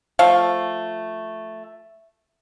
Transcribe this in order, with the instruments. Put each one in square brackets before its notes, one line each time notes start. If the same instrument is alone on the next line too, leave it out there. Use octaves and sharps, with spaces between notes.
[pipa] F3 A3 F5